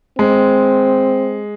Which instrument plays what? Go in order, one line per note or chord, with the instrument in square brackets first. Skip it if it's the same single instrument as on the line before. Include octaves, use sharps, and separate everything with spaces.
[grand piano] G#3 [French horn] C4